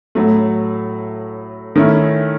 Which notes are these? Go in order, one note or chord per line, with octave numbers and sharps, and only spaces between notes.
A2 F#3 A3
D#3 A3 C#4 E4